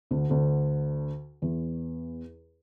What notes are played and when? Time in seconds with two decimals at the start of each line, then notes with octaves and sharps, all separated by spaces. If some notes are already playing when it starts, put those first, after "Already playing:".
0.11 D2 D3
0.29 D2 D3
1.42 E2 E3